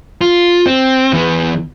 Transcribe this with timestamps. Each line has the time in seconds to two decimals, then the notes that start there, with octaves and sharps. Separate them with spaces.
0.21 F4
0.66 C4
1.13 E3 B3